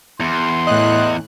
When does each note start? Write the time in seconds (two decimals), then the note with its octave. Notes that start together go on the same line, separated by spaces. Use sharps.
0.20 E2 C6
0.67 A2 D#5 F#6